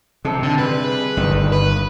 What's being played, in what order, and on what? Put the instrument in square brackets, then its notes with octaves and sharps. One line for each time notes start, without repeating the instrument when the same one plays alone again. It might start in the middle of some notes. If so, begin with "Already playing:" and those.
[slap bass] C3 [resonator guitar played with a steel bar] D#4 A4
[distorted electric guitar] D3
[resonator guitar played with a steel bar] G3 G#3 G#4 [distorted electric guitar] B4
[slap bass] G1 D#3 [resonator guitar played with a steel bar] D3 F3 D#4
[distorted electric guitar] B4